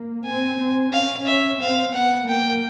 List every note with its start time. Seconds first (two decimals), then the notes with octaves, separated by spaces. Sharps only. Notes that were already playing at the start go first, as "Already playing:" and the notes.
Already playing: A#3
0.25 C4 G#5
0.59 C4
0.92 C#4 F5
1.26 E5
1.60 C4 F5
1.94 B3 F#5
2.27 A#3 G5